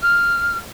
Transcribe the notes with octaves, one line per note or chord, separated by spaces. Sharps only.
F6